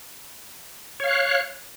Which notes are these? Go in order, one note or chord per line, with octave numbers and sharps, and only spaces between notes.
C#5 F5 F#6